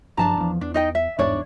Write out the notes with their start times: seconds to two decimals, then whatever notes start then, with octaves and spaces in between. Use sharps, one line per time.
0.17 F#1 G2 F3 D4 A5 A#5
0.37 E2 F3
0.61 E2 D4
0.74 D#4 D#5 G5
0.95 E5
1.19 G1 E2 G#2 D4 C#5 D5